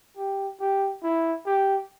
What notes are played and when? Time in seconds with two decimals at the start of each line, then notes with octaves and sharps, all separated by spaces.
0.17 G4
0.60 G4
1.03 E4
1.46 G4